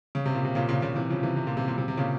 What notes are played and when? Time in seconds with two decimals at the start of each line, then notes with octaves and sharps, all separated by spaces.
0.15 C#3
0.25 C3
0.34 A#2
0.45 C3
0.55 A#2 C#3
0.69 A#2 C#3
0.82 A#2 C#3
0.96 C3 E3
1.10 C#3 F3
1.23 C3 E3
1.36 C3
1.47 A#2
1.57 C3
1.68 A#2
1.78 C3
1.88 C3
1.97 A#2 C#3